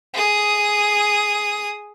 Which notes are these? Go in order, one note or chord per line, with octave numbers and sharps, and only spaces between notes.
G#4 D#6